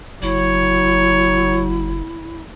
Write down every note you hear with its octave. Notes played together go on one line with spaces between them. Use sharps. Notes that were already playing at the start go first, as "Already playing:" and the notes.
F#1 F#3 E4 C#5